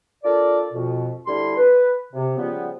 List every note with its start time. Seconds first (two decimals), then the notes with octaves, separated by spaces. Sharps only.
0.24 D4 F4 A4 A#4 D5
0.73 F2 B2
1.27 D2 G3 D4 E4 C6
1.57 B4
2.13 C3
2.37 C#3 F3 G3 B3